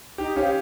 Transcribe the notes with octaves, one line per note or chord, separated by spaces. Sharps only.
D#4 G4
C#4 G4 C5 F5